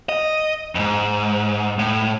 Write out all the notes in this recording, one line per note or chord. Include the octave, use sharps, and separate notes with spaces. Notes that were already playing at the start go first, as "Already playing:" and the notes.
D#5
F2 G#2
A2